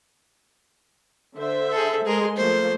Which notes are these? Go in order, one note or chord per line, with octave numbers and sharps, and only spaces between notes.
D3 C5 E5
G#4 A4
G#3 G#4 A#4 C6
F3 A3 A#3 C5